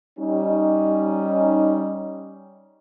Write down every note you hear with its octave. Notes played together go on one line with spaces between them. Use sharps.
G3 C#4 D#4